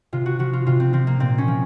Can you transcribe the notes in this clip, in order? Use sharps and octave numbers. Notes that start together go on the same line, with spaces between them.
C3 F4
F#4
F3 F#4
F4
C3 F4
C4
F3 C4
A#3
A#2 C4
C#4
F3